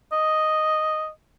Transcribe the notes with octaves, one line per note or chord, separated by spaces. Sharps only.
D#5